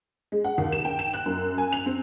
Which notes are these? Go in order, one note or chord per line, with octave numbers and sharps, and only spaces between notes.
G#3
F#5
D#2
E7
G5
E7
F#6
F#2
G#5
F7
C4